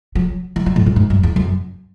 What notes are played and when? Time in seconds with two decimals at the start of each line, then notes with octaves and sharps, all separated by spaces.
0.15 F#3
0.56 E3
0.66 F#3
0.76 A2
0.86 F#2
0.96 G#2
1.10 F#2
1.23 E2
1.36 F#2